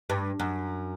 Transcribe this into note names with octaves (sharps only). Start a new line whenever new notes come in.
G2
F#2